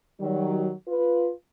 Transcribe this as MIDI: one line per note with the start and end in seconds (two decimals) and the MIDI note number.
0.20 0.72 51
0.20 0.72 54
0.20 0.72 55
0.87 1.31 65
0.87 1.31 71